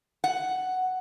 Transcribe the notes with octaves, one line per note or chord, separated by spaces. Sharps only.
F#5